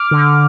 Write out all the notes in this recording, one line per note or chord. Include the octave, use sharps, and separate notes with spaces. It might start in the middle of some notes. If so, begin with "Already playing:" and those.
Already playing: D6 F6
D3